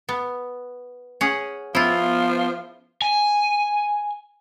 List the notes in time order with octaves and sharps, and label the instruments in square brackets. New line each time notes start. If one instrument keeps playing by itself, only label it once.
[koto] B3
C#4 G#4 F#5
[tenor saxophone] F3 [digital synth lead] B3 [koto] E4 F4
[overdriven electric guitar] G#5